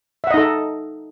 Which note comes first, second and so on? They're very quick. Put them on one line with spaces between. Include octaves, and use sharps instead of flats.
E5 F#5 D#5 D#4 A4